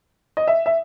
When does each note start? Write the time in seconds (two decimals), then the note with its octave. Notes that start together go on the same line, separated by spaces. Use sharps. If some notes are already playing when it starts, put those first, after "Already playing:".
0.37 D#5
0.48 E5
0.66 E5